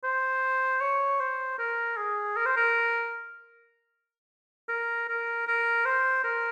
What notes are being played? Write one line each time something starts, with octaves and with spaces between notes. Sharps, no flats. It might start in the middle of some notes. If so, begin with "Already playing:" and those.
C5
C#5
C5
A#4
G#4
A#4
C5
A#4
A#4
A#4
A#4
C5
A#4